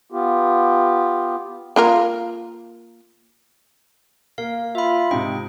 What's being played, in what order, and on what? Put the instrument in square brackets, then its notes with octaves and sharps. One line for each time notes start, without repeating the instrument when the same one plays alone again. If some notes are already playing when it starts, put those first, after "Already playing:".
[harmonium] B3 F4 G4
[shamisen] A#3 F4 A#4
[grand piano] A#3 [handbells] F5
[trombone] F4 [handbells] E5 B5
[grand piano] G#2 C3 D#4 [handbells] G5